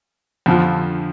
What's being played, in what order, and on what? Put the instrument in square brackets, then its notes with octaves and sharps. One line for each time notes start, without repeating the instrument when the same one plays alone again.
[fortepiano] F2 D3 F3